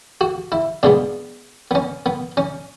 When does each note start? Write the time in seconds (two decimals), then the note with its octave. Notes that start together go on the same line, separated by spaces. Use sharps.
0.21 F#4
0.52 E4
0.83 B2 G#3 B3 D4
1.71 B3
1.75 C#4
2.06 B3
2.37 C#4